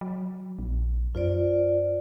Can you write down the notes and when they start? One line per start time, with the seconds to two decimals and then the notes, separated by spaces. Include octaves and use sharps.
0.01 F#3
0.59 A#1
1.15 F#2 F4 C5 D5